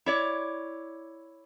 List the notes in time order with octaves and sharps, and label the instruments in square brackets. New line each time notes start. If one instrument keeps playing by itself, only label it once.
[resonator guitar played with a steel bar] E4 C#5 D5